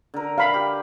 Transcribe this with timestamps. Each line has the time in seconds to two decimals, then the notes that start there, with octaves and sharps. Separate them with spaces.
0.14 D3 A#4
0.38 F5 B5
0.54 G4